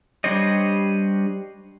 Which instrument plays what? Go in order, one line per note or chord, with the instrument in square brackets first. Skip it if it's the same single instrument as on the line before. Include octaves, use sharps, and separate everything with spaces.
[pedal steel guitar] G3 D4 C5 C#5 D#5